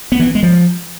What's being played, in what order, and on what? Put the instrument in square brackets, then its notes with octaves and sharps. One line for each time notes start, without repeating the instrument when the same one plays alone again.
[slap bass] B3
E3
B3
G#3
F3